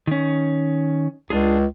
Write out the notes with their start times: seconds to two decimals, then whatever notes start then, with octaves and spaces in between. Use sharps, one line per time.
0.07 D#3 C#4
1.30 C#2 D4 F4 G#4